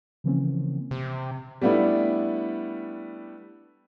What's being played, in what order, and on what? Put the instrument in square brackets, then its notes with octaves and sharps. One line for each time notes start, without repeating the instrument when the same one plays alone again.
[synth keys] C#3 E3 F3 A#3 C4 C#4
[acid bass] C3
[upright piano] G3 A3 B3 D4 E4